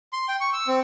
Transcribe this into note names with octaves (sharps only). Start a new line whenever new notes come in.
C6
G5
C#6
E6
C4